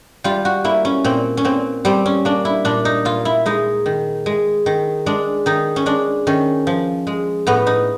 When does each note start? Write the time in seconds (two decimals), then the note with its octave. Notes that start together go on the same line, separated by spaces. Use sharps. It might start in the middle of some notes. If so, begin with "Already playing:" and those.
0.24 G3 F4
0.45 F#4
0.64 A#3 E4
0.85 C#4
1.04 A#2 C4
1.37 C#4
1.45 A#2 C4
1.85 G3 C4
2.06 C#4
2.25 A#3 D4
2.45 E4
2.65 A#2 D4
2.85 D#4
3.05 A#2 F4
3.25 E4
3.46 G#3 D#4
3.86 D#3
4.26 G#3
4.66 D#3
5.06 G#3 D4
5.46 D#3 D#4
5.76 C#4
5.86 G#3 D4
6.27 D#3 C#4
6.67 F3
7.07 G#3
7.47 A2 B3
7.67 D#4